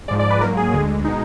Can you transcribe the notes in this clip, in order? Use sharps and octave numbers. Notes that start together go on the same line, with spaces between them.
G#2 F3 G#3 D5
D5
B4
G#2 F#3 A#3 A#4
G#4
D2 D3 G#3
B2 G#3 D#4